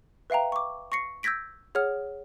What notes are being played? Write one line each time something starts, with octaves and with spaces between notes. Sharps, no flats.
B4 E5 F5 G5 A#5
C#6 D6
C#6 A#6 C7 C#7
E6 G6 G#6 A#6 B6 D7
G#4 C#5 F#5 F6